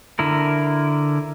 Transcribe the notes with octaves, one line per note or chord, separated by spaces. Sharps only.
D3 E4 A#4